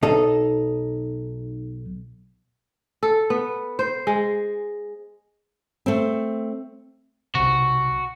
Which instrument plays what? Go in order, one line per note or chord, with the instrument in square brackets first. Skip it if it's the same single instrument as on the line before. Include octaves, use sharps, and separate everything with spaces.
[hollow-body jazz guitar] B1 D#4 A4
[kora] A4
B3
C5
G#3
[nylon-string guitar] A3 C4
[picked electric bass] B1 C3 [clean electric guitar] F#4